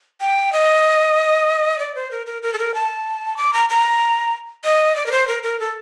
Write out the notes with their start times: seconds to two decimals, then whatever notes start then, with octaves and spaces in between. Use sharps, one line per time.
0.21 G5
0.53 D#5
1.79 D5
1.95 C5
2.11 A#4
2.26 A#4
2.42 A#4
2.53 A4
2.58 A#4
2.74 A5
3.37 D6
3.53 A#5
3.69 A#5
4.64 D#5
4.96 D5
5.06 A#4
5.12 C5
5.27 A#4
5.43 A#4
5.60 A4